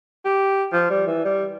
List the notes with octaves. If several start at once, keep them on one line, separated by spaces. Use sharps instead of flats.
G4
F3
G3
E3
G3